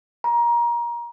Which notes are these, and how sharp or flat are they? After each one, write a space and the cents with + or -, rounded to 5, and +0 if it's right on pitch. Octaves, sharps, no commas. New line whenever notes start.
A#5 +25